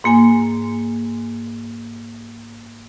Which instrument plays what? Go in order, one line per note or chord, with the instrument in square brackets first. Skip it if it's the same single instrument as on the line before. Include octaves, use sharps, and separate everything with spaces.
[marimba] G#2 A#3 G#5